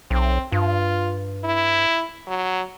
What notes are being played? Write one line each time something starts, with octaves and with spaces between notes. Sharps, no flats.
B1 C4
G2 F4
E4
F#3